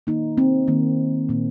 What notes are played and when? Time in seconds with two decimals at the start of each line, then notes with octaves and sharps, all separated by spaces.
0.07 D#3 A#3 D#4
0.38 C4
0.68 D#3 A#3
1.29 A#2 A#3